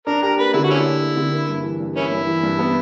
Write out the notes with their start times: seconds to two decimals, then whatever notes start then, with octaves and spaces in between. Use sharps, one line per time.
0.07 D4 A#4
0.23 G4 A#4
0.38 A#3 B4
0.54 D3 E4
0.64 F#4
0.69 C#4 D4 E4
0.85 G4
1.01 A#3
1.17 D3
1.33 A#3
1.49 G2
1.64 E3
1.80 G2
1.96 A#3 C#4 E4
2.11 G2
2.27 E3
2.43 G2
2.59 B3